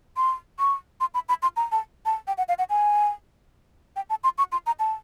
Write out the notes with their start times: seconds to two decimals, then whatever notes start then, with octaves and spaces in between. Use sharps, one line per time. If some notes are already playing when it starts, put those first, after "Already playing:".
0.17 C6
0.59 C#6
1.00 C6
1.14 B5
1.29 B5
1.42 C6
1.56 A#5
1.72 A5
2.05 A5
2.27 G5
2.38 F#5
2.48 F5
2.58 F#5
2.70 G#5
3.96 G5
4.10 A5
4.24 C6
4.38 C#6
4.52 C6
4.66 A#5
4.79 A5